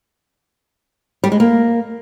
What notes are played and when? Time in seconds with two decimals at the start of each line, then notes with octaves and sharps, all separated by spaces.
1.24 G3
1.32 G#3
1.40 A#3